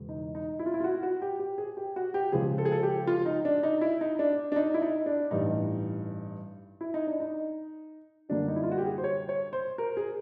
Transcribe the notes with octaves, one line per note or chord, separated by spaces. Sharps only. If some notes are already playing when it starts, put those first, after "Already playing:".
Already playing: E1 E2 C#3
D#4
D#4
E4
F4
E4
F4
F#4
F#4
G4
G4
G#4
G4
F#4
G4
C#2 C#3 F3 G#4
A4
G#4
A4
G4
F4
D#4
D4
D#4
E4
D#4
D4
D4
D#4
E4
D#4
D4
A1 G2 E3 G3 D#4
E4
D#4
D4
D#4
F#2 D3 G3 A#3 D4
D#4
E4
F4
F#4
G4
G#4
C5
C#5
C#5
C5
A#4
G#4